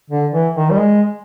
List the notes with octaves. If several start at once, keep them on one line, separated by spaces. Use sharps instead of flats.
D3
E3
D#3
G3
G#3